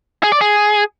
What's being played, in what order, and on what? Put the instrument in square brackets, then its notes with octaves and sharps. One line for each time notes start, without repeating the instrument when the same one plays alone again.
[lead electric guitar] G#4
D5
G#4